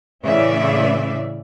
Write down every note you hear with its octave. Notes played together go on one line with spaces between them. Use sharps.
A2 C#3 E3 C#4 D5 E5